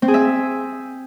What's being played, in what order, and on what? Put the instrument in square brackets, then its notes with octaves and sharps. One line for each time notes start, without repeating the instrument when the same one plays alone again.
[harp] C4
G#4
E5